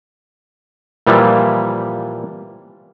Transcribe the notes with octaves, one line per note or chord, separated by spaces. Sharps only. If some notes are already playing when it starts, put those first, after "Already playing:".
A#2 E3 F3 G3